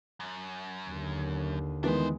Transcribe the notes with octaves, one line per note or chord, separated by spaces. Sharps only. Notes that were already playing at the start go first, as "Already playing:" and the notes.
F#2
D#2 D3
D#3 E3 G#3 B3 D4 C5